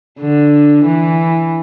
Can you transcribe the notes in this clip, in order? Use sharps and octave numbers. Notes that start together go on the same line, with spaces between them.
D3
E3